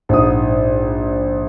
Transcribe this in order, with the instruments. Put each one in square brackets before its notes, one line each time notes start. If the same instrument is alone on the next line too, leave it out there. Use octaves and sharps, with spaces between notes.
[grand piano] A#1 G#2 D#6